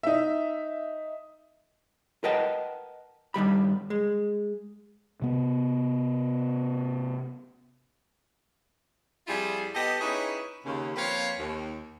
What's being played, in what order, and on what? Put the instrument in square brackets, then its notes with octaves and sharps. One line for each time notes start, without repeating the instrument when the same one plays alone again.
[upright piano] D#4 E5
[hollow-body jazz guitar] A#4 B4 D#5 F#5 G5 A5
G2 D#3 G3 B5
G#3
[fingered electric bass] C3 B3
[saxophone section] F2 G3 E4 F4 G4 G#4
B3 G4 A4 D#5
C#4 D#4 E4 G#4 B4 C#5
D#2 C#3
F3 A#3 C4 B4 C#5 F5
D#2